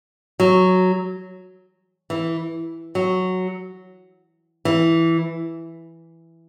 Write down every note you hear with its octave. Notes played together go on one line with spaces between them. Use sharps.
F#3
E3
F#3
E3